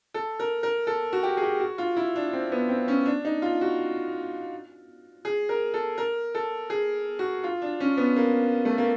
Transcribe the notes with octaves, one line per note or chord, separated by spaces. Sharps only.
A4
A#4
A#4
A4
F#4
G4
G#4
G4
F#4
F4
E4
D4
C4
B3
C4
C#4
D4
D#4
F4
F#4
G#4
A#4
A4
A#4
A4
G#4
F#4
F4
D4
C#4
B3
A#3
A3
A#3